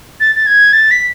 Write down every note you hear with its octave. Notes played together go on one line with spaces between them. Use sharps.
A6
A6
G#6
A6
B6